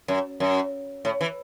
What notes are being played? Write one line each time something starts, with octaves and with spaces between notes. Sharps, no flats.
F#2
F#2
A2
E3